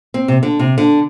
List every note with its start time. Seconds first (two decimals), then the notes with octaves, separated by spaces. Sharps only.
0.14 C4
0.28 C3
0.43 D3
0.59 C3
0.78 D3